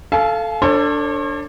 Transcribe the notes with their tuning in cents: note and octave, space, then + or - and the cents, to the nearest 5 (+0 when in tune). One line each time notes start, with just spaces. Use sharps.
A4 +0 F5 -15 G#5 +45
D4 -5 A4 +30 C#5 -45